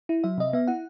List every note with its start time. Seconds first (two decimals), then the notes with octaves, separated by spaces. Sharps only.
0.09 E4
0.24 F#3 E5
0.38 C3 D#5
0.53 B3 E5
0.67 E4 F#5